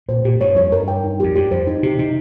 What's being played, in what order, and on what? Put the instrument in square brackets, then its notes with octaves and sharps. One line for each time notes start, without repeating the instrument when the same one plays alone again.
[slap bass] A#2 [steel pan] C5
[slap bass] A#2 [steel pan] G4
[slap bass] G2 [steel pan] C#5
[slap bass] F2 [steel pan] C#5
[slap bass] G2 [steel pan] A#4
[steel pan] G5
D#4
[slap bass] F2 [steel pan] G4
[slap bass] G2 [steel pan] G4
[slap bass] F2 [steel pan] C5
[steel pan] D#4
[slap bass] C3 [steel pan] G4
[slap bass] C3 [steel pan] D#4